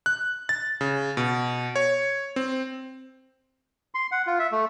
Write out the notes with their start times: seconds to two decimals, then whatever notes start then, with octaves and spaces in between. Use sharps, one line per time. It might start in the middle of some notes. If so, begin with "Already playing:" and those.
0.06 F#6
0.49 A6
0.81 C#3
1.17 B2
1.76 C#5
2.36 C4
3.95 C6
4.12 F#5
4.27 F4
4.39 E5
4.52 A3